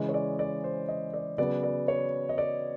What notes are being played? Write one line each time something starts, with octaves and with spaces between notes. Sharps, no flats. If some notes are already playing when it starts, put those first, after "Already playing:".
Already playing: C#3 E3 G#3 C#4 D#5
C#5
D5
D5
C5
D#5
D5
C#3 F#3 B3 D5
D5
C#5
D#5
D5